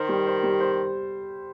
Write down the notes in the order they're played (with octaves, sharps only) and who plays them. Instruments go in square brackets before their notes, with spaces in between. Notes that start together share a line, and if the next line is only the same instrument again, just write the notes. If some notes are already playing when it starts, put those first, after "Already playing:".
Already playing: [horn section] D#3 [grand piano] C5
[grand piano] G3
C5
G3
C5